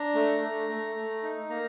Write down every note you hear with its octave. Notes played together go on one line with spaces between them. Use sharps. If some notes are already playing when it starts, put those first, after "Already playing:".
Already playing: D4 A#5
A3
A3
A3
A3
D#4
A#3 A#5